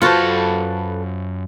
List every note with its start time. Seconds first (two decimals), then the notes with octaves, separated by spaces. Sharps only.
0.02 F#2 F4 F#4 A4 B4 C5 A5